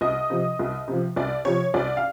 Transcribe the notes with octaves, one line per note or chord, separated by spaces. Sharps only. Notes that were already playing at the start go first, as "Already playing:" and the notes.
C2 D#5
C3 F3
C2
C3 F3
C2 D5
C3 F3 C#5
C2 D5
F5